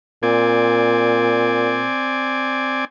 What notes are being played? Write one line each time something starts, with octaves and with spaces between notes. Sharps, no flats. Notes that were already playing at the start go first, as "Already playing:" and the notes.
A#2 C4 D5 G#5